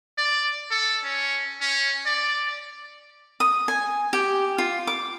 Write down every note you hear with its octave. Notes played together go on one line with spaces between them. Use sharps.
D5
A4
C#4
C#4
D5
D#6
G#5
G4
F4
D6